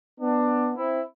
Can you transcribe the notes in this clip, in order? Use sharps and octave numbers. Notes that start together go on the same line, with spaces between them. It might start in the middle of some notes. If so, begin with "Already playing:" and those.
B3 D4
C4 E4